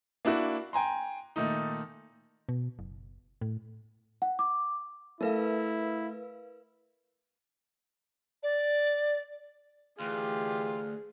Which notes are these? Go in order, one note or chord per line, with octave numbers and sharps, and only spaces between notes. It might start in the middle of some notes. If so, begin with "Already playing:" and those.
A#3 D4 E4 F#4
G5 G#5 A#5 C6
A#2 D#3 A3 D#4
B2
F#1
A2
F#5
D6
A3 E4 A#4 B4 F5
D5
D2 E3 F4 G4 G#4